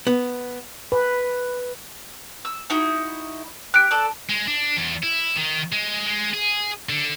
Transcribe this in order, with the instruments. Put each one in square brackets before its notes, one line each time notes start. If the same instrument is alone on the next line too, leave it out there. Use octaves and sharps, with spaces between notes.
[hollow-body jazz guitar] B3
[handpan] B4
[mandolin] E6
D#4 E4 F#4
[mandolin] G4 [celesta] F#6 D7
[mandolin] A4 D5 E6
[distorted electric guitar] G#3
D4
E2
E4
D#3
G#3
G#3
G#4
D3